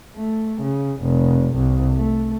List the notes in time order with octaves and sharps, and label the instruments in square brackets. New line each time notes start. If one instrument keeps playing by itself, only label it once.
[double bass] A3
C#3
F1
C2
A3